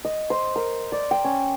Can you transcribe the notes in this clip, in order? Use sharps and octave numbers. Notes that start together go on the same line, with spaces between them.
D#5
C5
A#4
D5
G5
C#4